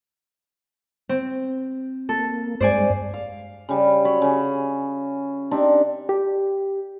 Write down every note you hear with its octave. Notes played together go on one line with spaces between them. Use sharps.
C4
A#3 A4
G2 G#3 C5 D5 G#5
F5
C#3 G3
F#3 C#5 B5
C#3 G#4
C4 D4 D#4 G4
G4